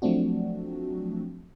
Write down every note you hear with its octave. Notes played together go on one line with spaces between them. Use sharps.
F3 F#3 A3 C4 D4 F#4